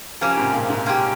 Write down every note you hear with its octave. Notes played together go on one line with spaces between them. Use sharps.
C#3 F3 A#3 C#4 G4
G#2 C3
A#2
G#2
G#2 A#3 C#4 G4